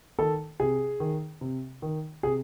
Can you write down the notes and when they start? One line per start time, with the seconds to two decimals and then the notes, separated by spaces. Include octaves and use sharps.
0.19 D#3 A4
0.60 C3 G#4
1.00 D#3
1.41 C3
1.82 D#3
2.23 C3 G#4